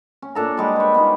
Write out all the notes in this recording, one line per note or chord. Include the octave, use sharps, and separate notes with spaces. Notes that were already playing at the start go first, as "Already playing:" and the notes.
C#4
A#2 D4 A4 A#5
G3 G#3 G4
B4 C#5
B3 C#4 D#4 F4